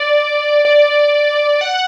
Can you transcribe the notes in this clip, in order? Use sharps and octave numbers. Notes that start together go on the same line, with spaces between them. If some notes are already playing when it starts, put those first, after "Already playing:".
Already playing: D5
D5
F#5